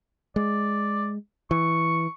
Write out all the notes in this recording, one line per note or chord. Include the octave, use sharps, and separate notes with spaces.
G#3 D5
E3 C#6